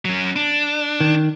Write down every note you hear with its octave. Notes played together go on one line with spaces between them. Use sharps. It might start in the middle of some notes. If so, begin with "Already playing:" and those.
F#3 C#4
D4
D#3